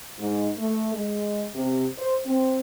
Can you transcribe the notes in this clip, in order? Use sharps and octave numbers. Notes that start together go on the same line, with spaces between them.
G#2
A3
G#3
C3
C5
C4